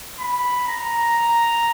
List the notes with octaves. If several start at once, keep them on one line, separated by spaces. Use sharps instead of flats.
B5
A#5